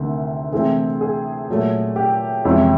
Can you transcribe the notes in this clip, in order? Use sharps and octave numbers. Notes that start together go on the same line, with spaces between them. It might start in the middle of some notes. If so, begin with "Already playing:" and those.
Already playing: D2 C3 D#3 A3
C3 E3 A3 C4 G#4
G#4
A#2 F#3 A3
G4
F2 C3 E3 G#3 C#4